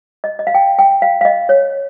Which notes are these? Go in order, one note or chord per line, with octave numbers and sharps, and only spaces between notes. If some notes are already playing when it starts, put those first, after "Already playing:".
D#5
D#5
F5
G5
G5
F5
F5
D#5
C#5